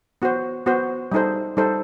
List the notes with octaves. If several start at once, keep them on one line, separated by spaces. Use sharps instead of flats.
B3 F#4 C5
B3 F#4 C5
G3 D#4 A4 C5
G3 D#4 A4 C5